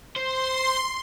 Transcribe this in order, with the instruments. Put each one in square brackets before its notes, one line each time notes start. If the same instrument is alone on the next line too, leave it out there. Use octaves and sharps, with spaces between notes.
[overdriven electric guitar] C5 [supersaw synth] C6